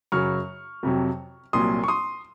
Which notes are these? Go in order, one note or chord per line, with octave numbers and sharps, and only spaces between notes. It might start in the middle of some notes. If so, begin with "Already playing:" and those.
F#2 C#3 F#3 C#6 F6
F2 C3 F#3
C2 A#2 F#3 C6 D#6
C#6
C6 D#6